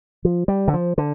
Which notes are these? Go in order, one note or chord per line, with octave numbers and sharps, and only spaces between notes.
F3
G3
D3
F3
D3